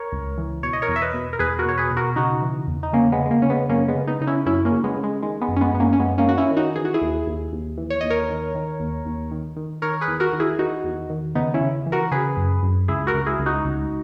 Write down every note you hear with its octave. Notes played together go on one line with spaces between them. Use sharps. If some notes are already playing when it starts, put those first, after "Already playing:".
Already playing: A#4 C#5
C#2
E3
B2 C#5
D#5
A#4 C#5
E2
E5
B4 D#5
B2
A#4
E2 G#4 B4
F#4 A#4
B2 C#5
G#4 B4
B2
F#4 A#4
C#3 D#4 F#4
E3
E2
D#4
C#3 A#3 C#4
G#3 B3
C#3
G#3
A#3
C#3 C#4
G#3 B3
F#2 A#3 C#4
G#3 B3
C#3
B3 D#4
C#3 D#4
C#4 E4
F#2 C#4 E4
A#3 C#4
C#3
G#3 B3
C#3
G#3
D#3 G#3
G#3 B3
F#2
C#4
G#3 B3
F#2 B3
A#3 C#4
C#4
F#2 G#3 B3
A#3 C#4
D#3 F#4
C#4 E4
D#3
D#4 F#4
E3 G#4
F#4
E4 G#4
D#2
D#2
D#2
E3
C#5
D#2 D#5
A#4 C#5
D#3
D#3
D#2
D#2
D#3
D#3
D#3 A#4 C#5
G#4 B4
E2
F#4 A#4
D#3
E4 G#4
D#3 D#4 F#4
E2
D#3
C#3 B3 D#4
C#4 E4
C#3
E3
F#4 A#4
C#3 G#4 B4
F#2
F#2
C#2 E4 G#4
F#4 A#4
C#2
E4 G#4
C#2
D#4 F#4
C#2